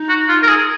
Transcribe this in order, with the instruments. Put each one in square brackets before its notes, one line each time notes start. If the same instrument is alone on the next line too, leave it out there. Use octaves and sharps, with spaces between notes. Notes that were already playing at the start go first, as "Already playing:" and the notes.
Already playing: [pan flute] D#4
[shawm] F#4
F4
A#4
G#4